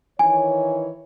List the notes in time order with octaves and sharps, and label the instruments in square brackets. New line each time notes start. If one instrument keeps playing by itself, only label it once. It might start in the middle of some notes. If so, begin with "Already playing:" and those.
[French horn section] D#3 E3 C#5 [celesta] G#5